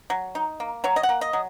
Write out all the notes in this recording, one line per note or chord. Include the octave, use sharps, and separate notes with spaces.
F#3
D#4
A#3
F#3 C#5
D#5
F#5
A#3
D#5
F#3